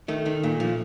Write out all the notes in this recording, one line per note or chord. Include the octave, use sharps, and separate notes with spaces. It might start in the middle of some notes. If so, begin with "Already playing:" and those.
D#3 A3
D#3
A#2
F3